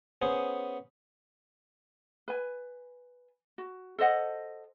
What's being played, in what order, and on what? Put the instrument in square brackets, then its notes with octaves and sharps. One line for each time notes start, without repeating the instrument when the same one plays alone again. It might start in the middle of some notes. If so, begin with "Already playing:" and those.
[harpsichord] B3 C#4 G#4 C5
[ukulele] B4 G#5
F#4
A4 C5 D#5 F#5